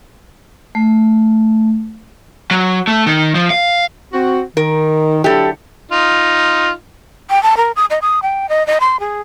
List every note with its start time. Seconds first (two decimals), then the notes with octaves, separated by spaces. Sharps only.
0.75 A3
2.51 F#3
2.87 A3
3.06 D#3
3.35 F3
3.50 F5
4.13 C4 F#4
4.57 D#3 A#4
5.24 D3 F#3 E4 G4 A4
5.92 D#4 F4
7.30 G5
7.43 A5
7.57 A#4
7.76 D#6
7.90 D#5
8.02 D#6
8.22 G5
8.49 D#5
8.67 D#5
8.80 C6
9.00 G#4